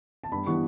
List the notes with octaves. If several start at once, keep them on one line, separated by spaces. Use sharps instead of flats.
A5
G2 B5
E3 G3 B3 C#6